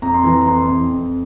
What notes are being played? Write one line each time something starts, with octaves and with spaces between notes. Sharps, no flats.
F2 A#5
C6
E3 A#5
A#5
F2 C6
F2
F2